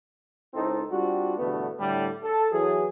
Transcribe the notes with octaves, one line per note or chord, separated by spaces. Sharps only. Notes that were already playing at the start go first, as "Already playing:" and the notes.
C#2 C4 D#4 E4 A4 C5
G3 C4 D4 F4 F#4
E2 G2 B2 D3 A3 B3
A2 D3 G3
A4
E3 F#3 G#4